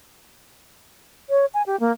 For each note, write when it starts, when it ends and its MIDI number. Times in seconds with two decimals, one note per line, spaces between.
1.30 1.46 73
1.54 1.62 80
1.67 1.79 67
1.80 1.92 58